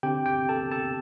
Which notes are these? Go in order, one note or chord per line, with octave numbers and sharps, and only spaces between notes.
D3 C4 G4 G5
G4 G5
A4 A5
A4 A5